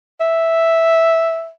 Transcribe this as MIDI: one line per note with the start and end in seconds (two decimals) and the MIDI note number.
0.21 1.50 76